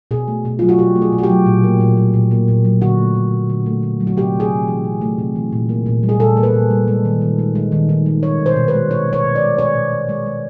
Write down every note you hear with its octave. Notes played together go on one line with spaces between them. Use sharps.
B2 G#4
A3
B2
F#3 F4
F#4
B2 G4
A3
G#4
B2
F#4
G4
F#3
A#2
A#3
A#2
F#3
A#2
A#3
A#2
F#3
D3 F#4
A3
D3
F#3
D3
A3
D3
F#3
F#4
C3 G4
A3
G#4
C3
E3
C3
A3
C3
E3
A#2
A#3
A#2
G3
G#4
A#2 A4
A#3
B4
A#2
G3
G#3
D#3
D#3
G#3
G#3
D#3
D#3
G#3
G#3 C#5
B2
C5
B2
B4
G#3
G#3 C#5
B2 C#5
B2
D5
G#3
G#3 C#5
B2
B2
G#3
G#3